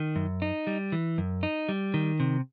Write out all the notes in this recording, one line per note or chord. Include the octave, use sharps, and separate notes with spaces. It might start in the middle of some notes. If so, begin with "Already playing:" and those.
Already playing: D#3
F#2
D#4
G3
E3
F#2
D#4
G3
D#3
C3